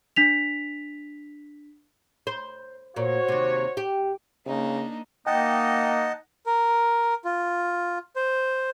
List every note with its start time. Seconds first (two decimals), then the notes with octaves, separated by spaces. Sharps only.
0.16 D4 B6 F7
2.27 C5
2.96 A#2 F#4 C5 C#5
3.28 D#2 C3
3.77 G4
4.46 C#3 A#3 D4 D#4
5.27 A#3 D#4 D#5 F#5 G5 A5
6.46 A#4
7.25 F4
8.16 C5